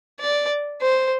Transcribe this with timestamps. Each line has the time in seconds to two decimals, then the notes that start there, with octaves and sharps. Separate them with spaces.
0.20 D5
0.82 C5